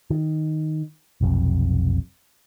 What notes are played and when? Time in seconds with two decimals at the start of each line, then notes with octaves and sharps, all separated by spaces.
0.10 D#3
1.21 F1 B1 F2